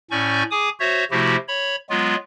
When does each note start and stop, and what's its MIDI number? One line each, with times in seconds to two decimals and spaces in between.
0.11 0.43 45
0.11 0.43 61
0.11 0.43 74
0.11 0.43 80
0.11 0.43 85
0.11 0.43 91
0.51 0.69 68
0.51 0.69 80
0.51 0.69 86
0.51 0.69 87
0.80 1.04 66
0.80 1.04 72
0.80 1.04 73
0.80 1.04 76
1.11 1.36 48
1.11 1.36 53
1.11 1.36 57
1.11 1.36 64
1.11 1.36 66
1.11 1.36 67
1.48 1.76 73
1.48 1.76 83
1.90 2.16 54
1.90 2.16 56
1.90 2.16 59
1.90 2.16 65